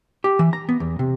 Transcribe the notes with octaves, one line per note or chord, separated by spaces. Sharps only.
G4
E3
A#5
B3
E2
C3